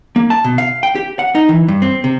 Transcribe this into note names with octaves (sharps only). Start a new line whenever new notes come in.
A#3
A5
B2
F5
G5
G4
F#5
D#4
E3
G2
C4
C3